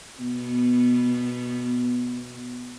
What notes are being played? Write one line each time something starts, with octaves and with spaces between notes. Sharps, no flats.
B2 B3